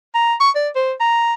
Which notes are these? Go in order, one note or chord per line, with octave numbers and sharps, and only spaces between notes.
A#5
C#6
D5
C5
A#5